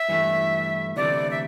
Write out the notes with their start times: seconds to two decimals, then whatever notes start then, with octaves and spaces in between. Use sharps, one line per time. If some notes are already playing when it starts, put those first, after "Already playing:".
Already playing: E5
0.09 G2 E3 A3
0.96 D2 C3 E3 A3 D5
1.31 E5